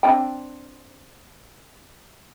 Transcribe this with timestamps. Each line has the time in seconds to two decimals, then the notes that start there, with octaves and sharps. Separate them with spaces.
0.03 C4 D4 G5